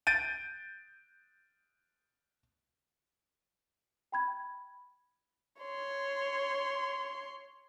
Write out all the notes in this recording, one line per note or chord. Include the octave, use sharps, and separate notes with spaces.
G6 A6 D7 D#7
G5 B5 G#6
C#5 C6